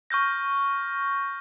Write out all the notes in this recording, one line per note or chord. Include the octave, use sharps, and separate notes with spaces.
C#6 F6 G6 A#6